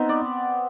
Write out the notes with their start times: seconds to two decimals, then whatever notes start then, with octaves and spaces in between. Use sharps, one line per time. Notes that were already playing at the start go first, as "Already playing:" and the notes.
Already playing: B3 C4 D#4
0.09 D5